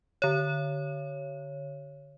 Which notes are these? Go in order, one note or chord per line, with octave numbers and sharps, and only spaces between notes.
D3 C#5